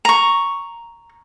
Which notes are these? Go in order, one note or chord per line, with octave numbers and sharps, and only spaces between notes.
A#5 C#6